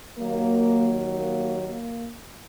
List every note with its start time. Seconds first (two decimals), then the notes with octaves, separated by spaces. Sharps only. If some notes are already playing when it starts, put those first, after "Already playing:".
0.18 D#2 D#3 F#3 A#3
1.19 A#3
1.70 A#3